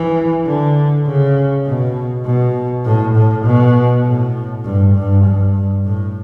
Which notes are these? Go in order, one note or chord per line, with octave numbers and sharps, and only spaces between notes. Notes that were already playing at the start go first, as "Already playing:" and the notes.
Already playing: E3
D3
C#3
B2
B2
A2
A2
B2
A2
G2
G2
G2
A2